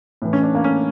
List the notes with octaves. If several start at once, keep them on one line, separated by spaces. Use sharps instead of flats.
A2 E3
C#4
D4
A#3
C#4